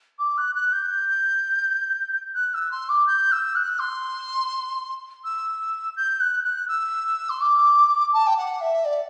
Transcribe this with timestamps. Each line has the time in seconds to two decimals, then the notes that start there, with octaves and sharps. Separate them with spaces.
0.19 D6
0.37 F#6
0.55 F#6
0.72 G6
2.35 F#6
2.54 E6
2.71 C6
2.89 D6
3.07 G6
3.32 E6
3.55 F#6
3.79 C6
5.24 E6
5.96 G6
6.20 F#6
6.44 F#6
6.68 E6
7.29 C6
7.40 D6
8.13 A5
8.27 G5
8.37 F#5
8.61 E5
8.84 D5